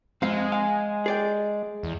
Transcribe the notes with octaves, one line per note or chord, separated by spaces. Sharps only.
F2 G#3 C4 F5
F5 G#5
G#4 D5 G5
E2